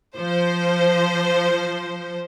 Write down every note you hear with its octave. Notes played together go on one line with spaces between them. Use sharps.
F3 C5